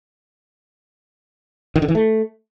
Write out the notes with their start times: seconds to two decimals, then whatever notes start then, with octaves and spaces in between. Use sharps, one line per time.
1.76 D#3
1.82 D3
1.88 E3
1.95 A3